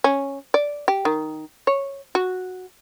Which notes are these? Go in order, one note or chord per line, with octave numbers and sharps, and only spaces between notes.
C#4
D5
G4
D#3
C#5
F#4